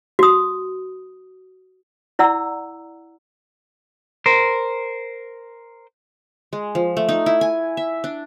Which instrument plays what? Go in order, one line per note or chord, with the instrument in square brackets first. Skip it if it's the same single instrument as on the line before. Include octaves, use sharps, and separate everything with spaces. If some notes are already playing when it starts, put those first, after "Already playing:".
[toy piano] F#4 D#6
E4 D5 F#5 A#5 E6
[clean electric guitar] A#4 C5
[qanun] G#3
F3
A3
D#4
E4
G#5
E5
D4